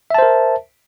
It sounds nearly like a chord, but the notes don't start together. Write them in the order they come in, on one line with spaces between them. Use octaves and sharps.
E5 A5 C5 A#4